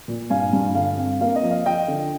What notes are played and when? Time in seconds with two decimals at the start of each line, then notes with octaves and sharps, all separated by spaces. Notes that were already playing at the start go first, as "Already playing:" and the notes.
0.08 A#2
0.30 G2 F5 G#5
0.53 G2
0.75 D3 F5
0.98 C4
1.21 A#3 F5
1.36 D#5
1.43 F3
1.51 F5
1.65 F3 D#5 G5
1.88 D3